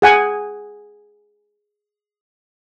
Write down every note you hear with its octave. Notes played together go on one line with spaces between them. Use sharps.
G#4 F#5 G#5